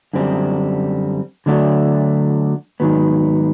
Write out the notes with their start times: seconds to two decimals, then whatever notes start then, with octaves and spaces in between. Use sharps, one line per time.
0.13 F#2 D3 G3 C4
1.46 D3 F#3 A3 D4 F#4
2.80 G#2 D#3 F#3 B3